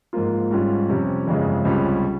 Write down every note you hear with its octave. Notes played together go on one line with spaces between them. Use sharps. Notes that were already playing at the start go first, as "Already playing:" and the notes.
G#2 F3 A#3 F4
G#2 G3 C#4 F4
F2 C3 G3 C#4
G1 F2 C#3 G#3
C#2 C3 G3 C#4 F4